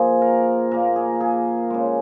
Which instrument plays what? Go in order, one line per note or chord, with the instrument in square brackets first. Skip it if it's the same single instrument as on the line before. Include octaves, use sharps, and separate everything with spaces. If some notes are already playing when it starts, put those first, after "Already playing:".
Already playing: [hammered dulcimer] A#2 F3 A#3 G#4
A#4
A#2 A#3 A#4
G#4
G#4
C#3 G#3